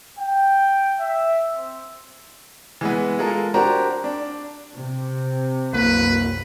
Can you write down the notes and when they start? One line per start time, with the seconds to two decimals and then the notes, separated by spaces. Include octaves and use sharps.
0.19 G5
1.00 E5
1.54 C4
2.81 E3 G#3 B3
3.19 G#3 F4 A4 A#4
3.54 D4 F#4 G4 A#4 C5 A#5
4.04 D4
4.74 C3
5.73 C2 F#2 A#3 B4